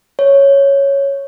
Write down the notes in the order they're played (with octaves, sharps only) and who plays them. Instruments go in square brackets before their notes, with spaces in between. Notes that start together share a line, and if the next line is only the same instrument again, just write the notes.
[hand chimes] C#5